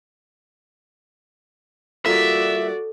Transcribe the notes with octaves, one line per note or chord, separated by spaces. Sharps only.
G3 A#3 F4 F#4 A4 D5 E5